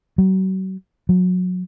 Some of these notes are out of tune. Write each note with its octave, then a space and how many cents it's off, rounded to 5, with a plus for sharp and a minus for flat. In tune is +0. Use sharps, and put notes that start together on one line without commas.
F#3 +40
F#3 -25